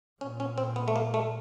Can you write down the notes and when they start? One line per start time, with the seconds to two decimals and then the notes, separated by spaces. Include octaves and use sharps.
0.21 A#2 C#4
0.40 C#4
0.58 C4
0.76 B3
0.88 A3
0.96 A#3
1.14 A3